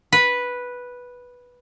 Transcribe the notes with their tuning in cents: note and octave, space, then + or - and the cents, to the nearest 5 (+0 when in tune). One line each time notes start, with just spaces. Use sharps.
B4 -5